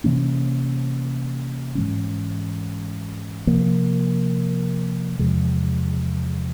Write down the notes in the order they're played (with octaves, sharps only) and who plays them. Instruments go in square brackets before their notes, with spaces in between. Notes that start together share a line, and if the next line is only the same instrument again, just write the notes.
[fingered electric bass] C3 E3 A#3 C#4
G#2 E3 G#3 C#4
C3 F3 A#3
E2 C3 F3 G#3